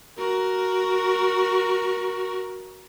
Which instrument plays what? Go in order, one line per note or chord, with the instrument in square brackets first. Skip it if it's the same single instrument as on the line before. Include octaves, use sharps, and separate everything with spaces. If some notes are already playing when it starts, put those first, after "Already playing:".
[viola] F#4 A#4